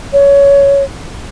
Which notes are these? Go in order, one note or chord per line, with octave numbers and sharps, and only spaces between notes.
C#5